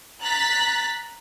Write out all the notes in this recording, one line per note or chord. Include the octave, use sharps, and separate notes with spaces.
A#5 F#6 A6 B6